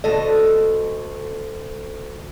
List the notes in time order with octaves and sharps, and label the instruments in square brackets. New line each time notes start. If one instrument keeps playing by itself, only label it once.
[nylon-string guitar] D2 A4 D#5